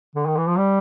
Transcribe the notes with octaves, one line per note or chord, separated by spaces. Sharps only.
D3
D#3
E3
F3
G3